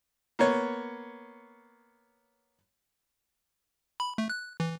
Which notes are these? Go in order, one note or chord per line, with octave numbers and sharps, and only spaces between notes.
A#3 B3 C#5
B5
A3
F#6
E3